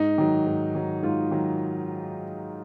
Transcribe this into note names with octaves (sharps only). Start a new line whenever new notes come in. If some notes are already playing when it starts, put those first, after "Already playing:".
Already playing: G#2 D#4
D#3 F#3
G#2
D#3 F#3
G#2 F4
D#3 F#3